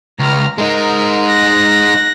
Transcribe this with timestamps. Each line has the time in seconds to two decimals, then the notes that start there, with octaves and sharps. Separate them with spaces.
0.19 C#2 A#5 F6
0.58 G#3 D#4 A#4
1.28 F#6 A#6